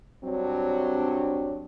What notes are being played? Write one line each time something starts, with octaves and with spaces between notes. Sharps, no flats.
G2 F#3 C4 D4 C#5